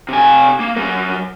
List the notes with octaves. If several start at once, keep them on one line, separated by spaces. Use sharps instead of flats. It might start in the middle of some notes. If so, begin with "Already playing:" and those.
C3 G#5
A#3
F#3 A#4